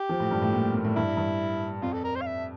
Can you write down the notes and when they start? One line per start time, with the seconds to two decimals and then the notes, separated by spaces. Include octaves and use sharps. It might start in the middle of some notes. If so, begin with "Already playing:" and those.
Already playing: G4
0.09 F3
0.20 A2
0.31 G2
0.42 A2
0.53 A#2
0.74 A#2
0.85 A2
0.96 G2 E4
1.17 G2
1.82 F2 F4
1.93 A4
2.04 A#4
2.15 C5
2.21 F5
2.26 E5